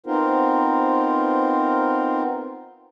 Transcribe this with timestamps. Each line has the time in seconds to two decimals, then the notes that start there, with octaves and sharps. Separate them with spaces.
0.06 B3 C4 D#4 F4 A#4 C5